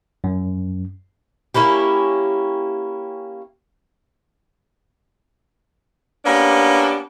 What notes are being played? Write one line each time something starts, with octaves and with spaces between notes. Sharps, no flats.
F#2
A#3 C#4 E4 G4
A#3 B3 C#4 D4 G4